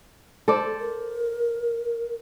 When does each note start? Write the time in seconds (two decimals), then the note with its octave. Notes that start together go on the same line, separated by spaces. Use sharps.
0.48 A4 C5 D5
0.80 A#4